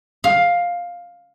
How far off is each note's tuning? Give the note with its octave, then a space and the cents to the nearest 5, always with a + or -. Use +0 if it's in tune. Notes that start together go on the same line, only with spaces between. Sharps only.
F5 +10